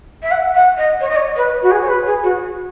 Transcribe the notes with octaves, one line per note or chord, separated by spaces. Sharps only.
E5
F#5
F#5
D#5
C#5
D#5
C#5
B4
F#4
G#4
C#5
B4
G#4
F#4